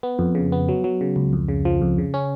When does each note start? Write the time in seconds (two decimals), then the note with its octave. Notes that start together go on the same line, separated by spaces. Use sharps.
0.03 B3
0.19 F2
0.35 C#3
0.52 B3
0.69 F#3
0.84 F#3
1.01 C#3
1.16 C#2
1.33 F2
1.48 C#3
1.65 F3
1.82 F2
1.98 C#3
2.14 C#4